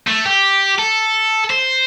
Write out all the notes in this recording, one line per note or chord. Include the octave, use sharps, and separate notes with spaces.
A3
G4
A4
C5